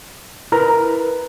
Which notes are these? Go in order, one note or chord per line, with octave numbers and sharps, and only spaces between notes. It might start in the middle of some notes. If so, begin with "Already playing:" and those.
E4 A#4 B4 A#5